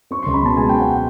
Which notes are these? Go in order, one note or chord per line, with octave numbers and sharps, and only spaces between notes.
C4 C#6
C#2 C6
B5
B2 A5
G#3 G#5
C4 G5
F#5